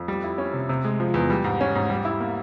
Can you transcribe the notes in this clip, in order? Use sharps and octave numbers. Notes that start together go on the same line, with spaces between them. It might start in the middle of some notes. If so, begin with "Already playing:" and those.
Already playing: F2
G3
E4
C#4
C3
C3
G#3
F3
E2
G3
G#2
C#4
G#2
G3
E4
A#3